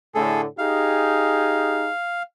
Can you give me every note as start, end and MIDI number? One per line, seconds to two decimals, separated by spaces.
0.15 0.45 45
0.15 0.45 50
0.15 0.41 68
0.15 0.41 69
0.58 1.89 63
0.58 1.89 67
0.58 1.89 68
0.58 2.23 77